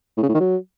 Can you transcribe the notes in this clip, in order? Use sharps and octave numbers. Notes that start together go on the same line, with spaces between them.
A2
C#3
A2
D#3
F#3